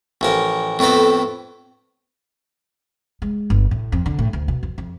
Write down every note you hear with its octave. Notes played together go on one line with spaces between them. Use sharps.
A1 F3 A#4
F2 A2 B3 C4 A4
G#3
G1
A2
F2
D3
A2
D2
B2
F2
F2